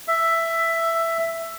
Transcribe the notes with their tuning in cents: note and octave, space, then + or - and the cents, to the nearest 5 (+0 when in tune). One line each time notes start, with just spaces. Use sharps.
E5 +10